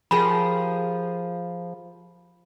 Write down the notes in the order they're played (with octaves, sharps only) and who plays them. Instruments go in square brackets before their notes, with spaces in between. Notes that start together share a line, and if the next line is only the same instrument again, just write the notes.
[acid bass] F3 [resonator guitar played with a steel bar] G4 G#4 A#4 [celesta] B5